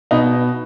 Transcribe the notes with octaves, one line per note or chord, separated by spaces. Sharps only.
B2 D#4